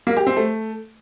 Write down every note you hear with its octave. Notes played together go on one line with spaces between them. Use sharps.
A#3
G4
C4
A3